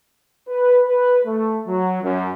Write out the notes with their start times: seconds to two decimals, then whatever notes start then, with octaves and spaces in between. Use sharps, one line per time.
0.48 B4
0.87 B4
1.25 A3
1.67 F#3
2.02 F#2